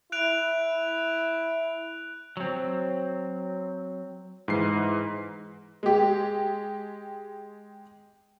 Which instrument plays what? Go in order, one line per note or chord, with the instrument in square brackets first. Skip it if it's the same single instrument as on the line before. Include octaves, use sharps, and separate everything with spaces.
[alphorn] E4 [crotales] F#6 D7 F7
[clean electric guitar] F#3 C4
[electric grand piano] G#2 E3 C7
[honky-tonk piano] G#3 G4